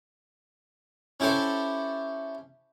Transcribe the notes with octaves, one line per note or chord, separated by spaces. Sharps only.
C#4 E4 G4 A4 C5